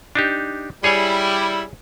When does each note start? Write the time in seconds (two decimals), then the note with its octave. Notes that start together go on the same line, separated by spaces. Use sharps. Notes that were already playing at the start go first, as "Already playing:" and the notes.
0.15 D4 D#4 G4
0.84 G3 E4 G#4 C#5 G#5